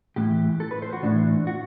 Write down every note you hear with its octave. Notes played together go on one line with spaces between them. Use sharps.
A2 E3 G4
A4
B4
C5
F#4
A2 E3 D4
F#4